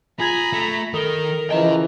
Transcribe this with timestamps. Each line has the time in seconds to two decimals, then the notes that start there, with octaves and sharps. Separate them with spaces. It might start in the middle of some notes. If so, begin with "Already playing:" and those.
0.20 F4 G#4 A#5 B5 G#6
0.53 A3
0.94 D#3 A4 A#4 D#6 G7
1.51 C#3 E3 F3 D#5 G5 A#5